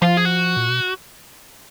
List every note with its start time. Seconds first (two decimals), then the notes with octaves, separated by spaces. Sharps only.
0.02 F3 F4
0.17 G#4
0.25 F#4
0.57 A#2
0.69 B2